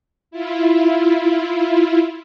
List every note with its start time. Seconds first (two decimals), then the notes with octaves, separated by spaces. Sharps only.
0.31 E4 F4